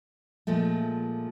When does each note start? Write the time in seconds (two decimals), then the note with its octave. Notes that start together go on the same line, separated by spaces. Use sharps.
0.47 A#2 F3 G#3 A3